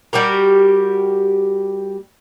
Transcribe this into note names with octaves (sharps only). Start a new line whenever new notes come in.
G3 F#4 G4 A#4